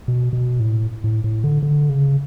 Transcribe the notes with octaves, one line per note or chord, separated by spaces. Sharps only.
B2
B2
A2
A2
A2
D3
D3
C#3